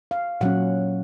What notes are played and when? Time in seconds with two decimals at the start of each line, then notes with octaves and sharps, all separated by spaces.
0.11 F5
0.41 A#2 F#3 C#4 F#5